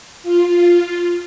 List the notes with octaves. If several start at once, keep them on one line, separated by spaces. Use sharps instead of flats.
F4